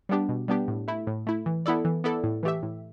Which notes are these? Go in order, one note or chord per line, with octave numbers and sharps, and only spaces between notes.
G3 B3 D4 G4
B2
G3 B3 D4 G4
A2
A3 E4
A2
A3 E4
E3
B3 E4 A4 D5
E3
B3 E4 A4 D5
A2
E3 A3 G4 E5
A2